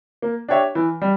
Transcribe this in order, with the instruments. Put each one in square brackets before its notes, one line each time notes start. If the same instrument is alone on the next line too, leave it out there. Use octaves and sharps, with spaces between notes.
[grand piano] A#3
D4 G4 C#5 E5
E3
G3